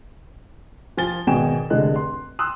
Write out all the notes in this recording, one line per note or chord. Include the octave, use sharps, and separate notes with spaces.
F3 F4 G#5 A6 G7
G#1 B2 G#4 G5 G#5 E7
F1 D3 G#3 D#5 F#6
C6
C6 D#6 E6 F#6